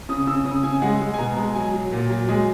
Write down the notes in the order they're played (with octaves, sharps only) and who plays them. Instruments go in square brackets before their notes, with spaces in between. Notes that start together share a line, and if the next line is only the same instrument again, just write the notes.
[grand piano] C#3 D#6
C#3 E6
C#3 D#6
C#3 G#5
G#3 F#5
G#3
G#5
B2 A#5
G#3
F#3 G#5
F#3
A#2
F#3
G#3